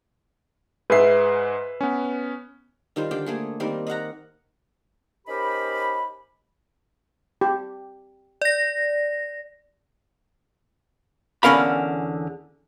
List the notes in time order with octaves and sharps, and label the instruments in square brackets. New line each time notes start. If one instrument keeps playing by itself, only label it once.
[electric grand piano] G#2 G#4 C7 [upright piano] B4 E5
[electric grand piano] B3 C#4
[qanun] D#3 G3 F4 C5
D3 G4 G5
A3 A#3 G#4
D#3 G3 A#3 C4
D#5 F5 F#5 A#5
[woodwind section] C#4 D#4 G4 A#4 C5 B5
[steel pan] G4
[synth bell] D5 A#6
[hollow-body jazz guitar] E2 D3 C#4 A#4 F5 B5